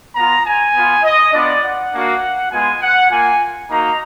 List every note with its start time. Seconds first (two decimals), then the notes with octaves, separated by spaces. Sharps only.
0.15 B3 F4 A#5
0.44 G#5
0.74 B3 F4
1.03 D#5
1.32 B3 D4 F4 D5
1.63 F#5
1.92 A#3 D4 F#4
2.51 G#3 B3 F4 G#5
2.81 F#5
3.10 A#3 F4 G#5
3.69 A#3 D#4 F#4 A#5